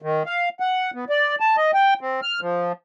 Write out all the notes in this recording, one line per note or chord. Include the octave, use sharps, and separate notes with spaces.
D#3
F5
F#5
B3
D5
A5
D#5
G5
C4
F6
F3